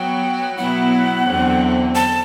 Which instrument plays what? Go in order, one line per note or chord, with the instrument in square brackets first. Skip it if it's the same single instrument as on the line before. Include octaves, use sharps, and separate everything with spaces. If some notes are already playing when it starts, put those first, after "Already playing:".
Already playing: [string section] F#3 B3 F#4 [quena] G5
[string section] B2 F#3 B3 E4 [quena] F#5
[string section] E2 D3 F#3 C4
[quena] A5